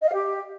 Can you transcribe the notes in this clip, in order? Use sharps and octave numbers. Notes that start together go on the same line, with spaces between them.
D#5
F5
G4